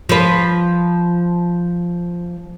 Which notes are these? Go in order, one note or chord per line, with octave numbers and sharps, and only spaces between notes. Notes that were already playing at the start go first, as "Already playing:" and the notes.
F3 B4